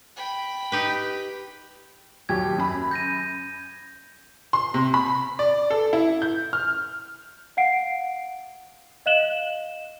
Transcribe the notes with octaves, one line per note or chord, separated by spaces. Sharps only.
G5 B5
D#4 G4 B4
D#2 F#3 G4 G#6
F#2 B5
G6 A#6 D#7
C6
C3
B5
D5
A4
E4
G6
F6
F5 F#5 C7 D7
D#5 F5 F#6 E7 F#7 G7